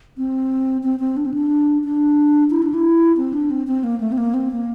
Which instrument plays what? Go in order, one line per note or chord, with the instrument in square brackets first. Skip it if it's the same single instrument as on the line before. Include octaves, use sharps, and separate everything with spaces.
[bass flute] C4
C4
C4
D4
C4
D4
D4
E4
D4
E4
C4
D4
C4
C4
A#3
A3
C4
A#3
C4
A#3